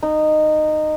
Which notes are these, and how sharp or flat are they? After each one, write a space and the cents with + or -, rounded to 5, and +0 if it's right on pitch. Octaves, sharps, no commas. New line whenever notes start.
D#4 -15